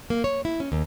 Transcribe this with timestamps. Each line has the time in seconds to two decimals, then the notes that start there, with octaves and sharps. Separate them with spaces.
0.10 A#3
0.24 C#5
0.45 E4
0.60 C#4
0.72 D#2